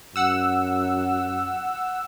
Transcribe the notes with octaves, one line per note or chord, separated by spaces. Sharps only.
F#2 F#5 E6